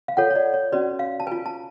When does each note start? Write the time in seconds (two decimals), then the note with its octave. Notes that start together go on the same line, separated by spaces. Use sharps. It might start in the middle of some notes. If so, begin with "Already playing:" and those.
0.08 F5
0.17 F4 A4 C#5 F#5
0.30 C#5
0.35 D5
0.54 C#5
0.72 C#4 F#4 B4 D5
0.99 F5
1.20 A5
1.27 F4 B4 G#5
1.46 A5